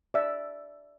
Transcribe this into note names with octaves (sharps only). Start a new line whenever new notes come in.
D5 E5